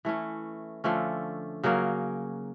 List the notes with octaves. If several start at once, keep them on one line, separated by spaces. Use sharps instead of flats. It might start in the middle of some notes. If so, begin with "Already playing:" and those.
E3 A3 C#4
D3 F3 A3 C#4
C#3 F#3 A#3 C#4